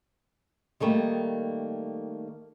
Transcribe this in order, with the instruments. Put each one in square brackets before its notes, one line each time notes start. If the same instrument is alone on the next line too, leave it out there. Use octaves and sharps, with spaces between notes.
[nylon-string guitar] D#3 G3 A3 A#3